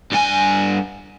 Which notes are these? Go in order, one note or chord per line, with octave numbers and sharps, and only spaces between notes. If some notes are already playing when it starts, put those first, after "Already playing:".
G2 G#5